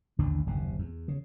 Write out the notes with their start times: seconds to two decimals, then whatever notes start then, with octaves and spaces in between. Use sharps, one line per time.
0.19 A1 D#2 D3 D4
0.47 F#1 D#2 C3
0.79 E2
1.08 C#3